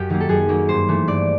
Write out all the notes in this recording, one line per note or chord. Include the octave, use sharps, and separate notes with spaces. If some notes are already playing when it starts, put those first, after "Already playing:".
Already playing: F#2 G4
D#3 F#3 A#3
A4
F#2 G#4
D#3 F#3 A#3
G2 C5
E3 A3
G2 D5